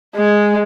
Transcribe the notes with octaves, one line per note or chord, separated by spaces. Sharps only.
G#3